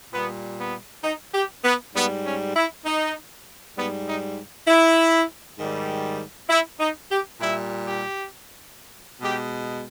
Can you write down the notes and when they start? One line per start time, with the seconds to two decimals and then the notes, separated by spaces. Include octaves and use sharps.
0.13 A#2 G3 B3
0.59 B3
1.03 D#4
1.34 G4
1.64 B3
1.94 G#2 G3 B3
2.25 C#4
2.55 E4
2.85 D#4
3.77 G#2 G3 B3
4.06 D#4
4.67 E4
5.58 G#2 D#3 G3
6.49 E4
6.80 D#4
7.10 G4
7.40 A#2 G3 E4
7.85 G4
9.21 B2 G#3 G4